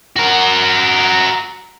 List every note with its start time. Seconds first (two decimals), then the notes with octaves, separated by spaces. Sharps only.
0.16 F#4 A#4